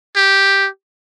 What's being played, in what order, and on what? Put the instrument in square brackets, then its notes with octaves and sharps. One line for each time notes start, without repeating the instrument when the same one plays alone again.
[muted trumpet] G4